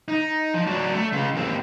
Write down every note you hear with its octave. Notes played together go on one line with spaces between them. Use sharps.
D#4
F3
F#3 D4
A3
C#3 F4
D#2 C4